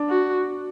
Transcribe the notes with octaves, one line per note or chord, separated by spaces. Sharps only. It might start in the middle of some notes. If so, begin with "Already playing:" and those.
Already playing: D4
F#4